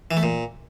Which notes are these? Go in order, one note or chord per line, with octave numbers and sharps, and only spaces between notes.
E3
A3
A#2